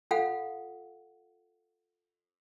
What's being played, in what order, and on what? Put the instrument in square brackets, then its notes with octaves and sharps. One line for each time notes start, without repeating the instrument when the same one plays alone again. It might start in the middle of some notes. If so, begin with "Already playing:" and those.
[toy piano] F4 A4 F5 F#5